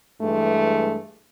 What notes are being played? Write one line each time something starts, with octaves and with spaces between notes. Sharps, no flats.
G2 E3 G#3 A3